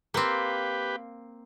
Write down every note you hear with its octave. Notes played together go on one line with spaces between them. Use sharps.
A#3 C4 G4 B4